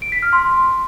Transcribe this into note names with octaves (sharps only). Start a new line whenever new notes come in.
D7
B6
F6
C6